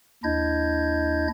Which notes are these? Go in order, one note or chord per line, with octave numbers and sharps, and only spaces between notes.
D#2 D4 E4 D#5 G6 G#6